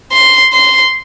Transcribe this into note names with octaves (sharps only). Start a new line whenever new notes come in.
C6
C6